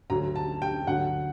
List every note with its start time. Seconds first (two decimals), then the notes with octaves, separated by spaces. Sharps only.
0.10 D2 D3 F#3 A#5
0.36 A5
0.62 G5
0.87 D2 D3 F#3 F#5